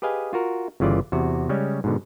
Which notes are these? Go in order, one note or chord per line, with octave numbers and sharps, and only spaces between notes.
G4 G#4 B4 D#5 F5 G#5
F4 F#4 A#4
G1 C#3 E3 F4 D5
E2 C3 F#4
C#3 G3 G#3 C#4
G#2 B2 D3